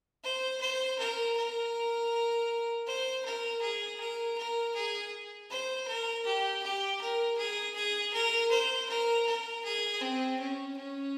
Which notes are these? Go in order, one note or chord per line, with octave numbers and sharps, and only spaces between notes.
C5
C5
A#4
A#4
C5
A#4
G#4
A#4
A#4
G#4
C5
A#4
G4
G4
A#4
G#4
G#4
A#4
C5
A#4
A#4
G#4
C4
C#4
C#4